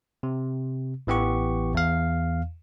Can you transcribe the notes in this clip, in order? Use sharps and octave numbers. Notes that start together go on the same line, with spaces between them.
C3
A1 E3 B3 G4 C#6
E2 F5